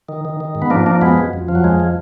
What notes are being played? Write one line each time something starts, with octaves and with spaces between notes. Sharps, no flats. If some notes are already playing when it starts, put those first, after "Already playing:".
D#3
D#3
D#3
G#2
B3
F3 A#3 D4
F3 A#3 D4
F#2 G#3 B3
F#2
F2
F3
F#3
F2 G#3
F3